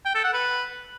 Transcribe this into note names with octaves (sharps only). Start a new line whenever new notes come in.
G5
A4
F#5
B4